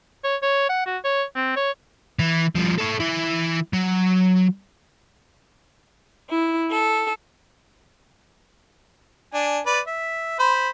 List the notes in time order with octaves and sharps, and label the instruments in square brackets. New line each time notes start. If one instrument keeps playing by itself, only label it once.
[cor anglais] C#5
C#5
F#5
F#4
C#5
C4
C#5
[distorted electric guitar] E3
G2 F3
A4 C#5
E3 E4
F#3
[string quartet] E4
A4
[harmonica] D4 G#5
B4 D5
E5
C5 B5